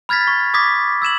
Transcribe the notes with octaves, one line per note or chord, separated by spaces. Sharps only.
B5 F6 G#6 A6 B6
C#6
D6 D#6 G#6 A#6 B6
E6 G#6 E7 F#7